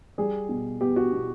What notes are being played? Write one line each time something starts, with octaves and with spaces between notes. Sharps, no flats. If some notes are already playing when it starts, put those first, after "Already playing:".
G3 G#4
B2
B3 G4
F#4
B2